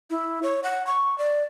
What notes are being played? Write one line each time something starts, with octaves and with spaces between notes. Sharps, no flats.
E4
C#5
F#5
C#6
D5